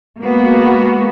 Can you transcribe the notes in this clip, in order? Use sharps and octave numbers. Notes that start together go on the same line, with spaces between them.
G#3 A#3 B3 F#4